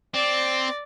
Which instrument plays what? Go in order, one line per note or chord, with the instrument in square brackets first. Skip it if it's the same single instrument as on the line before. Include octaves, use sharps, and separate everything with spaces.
[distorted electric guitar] C4 [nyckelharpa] D5